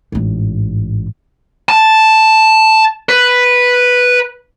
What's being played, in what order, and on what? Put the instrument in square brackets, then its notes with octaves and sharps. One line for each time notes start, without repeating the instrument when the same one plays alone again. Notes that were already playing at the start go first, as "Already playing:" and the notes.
[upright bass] A1 G#2
[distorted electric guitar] A5
B4